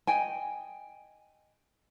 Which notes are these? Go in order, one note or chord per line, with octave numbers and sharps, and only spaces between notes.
D#5 G5 G#5